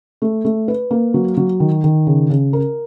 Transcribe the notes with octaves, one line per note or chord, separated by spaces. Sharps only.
A3
A3
B4
A#3
F#3
F#3
D#3
D#3
C#3
C#3
A#4